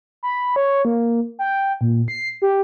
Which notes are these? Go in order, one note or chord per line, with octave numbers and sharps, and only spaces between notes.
B5
C#5
A#3
G5
A#2
C7
G4